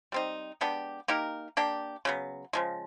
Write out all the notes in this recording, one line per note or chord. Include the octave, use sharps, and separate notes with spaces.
G3 C4 D#4
G#3 B3 D4 G4
A#3 D#4 G4 A#4
A#3 D4 G4
C#3 F#3 B3
C#3 F3 G#3